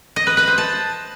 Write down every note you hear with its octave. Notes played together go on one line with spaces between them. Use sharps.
D#5
B4
B4
C5
A5